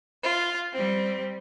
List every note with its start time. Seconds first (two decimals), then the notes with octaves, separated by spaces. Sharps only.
0.23 F4
0.73 G3 C4